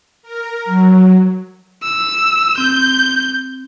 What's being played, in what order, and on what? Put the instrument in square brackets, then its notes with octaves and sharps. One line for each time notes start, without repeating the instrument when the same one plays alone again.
[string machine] A#4
F#3
[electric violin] E6
[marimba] C4 [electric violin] G6